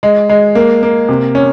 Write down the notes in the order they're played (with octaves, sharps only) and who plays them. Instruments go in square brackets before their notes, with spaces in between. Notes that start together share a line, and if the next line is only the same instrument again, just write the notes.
[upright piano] G#3
G#3
A#3
A#3
C3
C#4